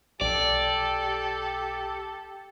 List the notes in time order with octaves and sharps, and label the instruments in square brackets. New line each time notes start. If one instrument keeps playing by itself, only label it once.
[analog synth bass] B1 [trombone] G4 [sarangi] A4 [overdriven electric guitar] D5